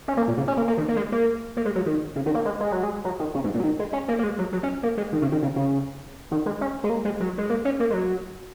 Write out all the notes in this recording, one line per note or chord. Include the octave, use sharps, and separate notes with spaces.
C#4
A#3
A#2
C#3
C#4
A#3
A#3
D#3
A#3
G#3
A#3
A#3
G#3
F#3
D#3
C#3
D#3
A#3
G#3
G#3
F#3
G#3
F#3
D#3
C#3
G#2
A#2
F#3
D#3
G#3
C#4
A#3
A#3
G#3
F#3
F#3
C#4
A#3
G#3
D#3
C#3
D#3
C#3
C#3
D#3
G#3
C#4
G#3
A#3
G#3
F#3
G#3
A#3
C#4
A#3
G#3
F#3